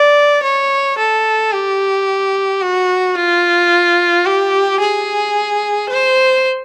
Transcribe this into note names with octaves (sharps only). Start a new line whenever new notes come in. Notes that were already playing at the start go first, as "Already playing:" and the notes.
Already playing: D5
C#5
A4
G4
F#4
F4
G4
G#4
C5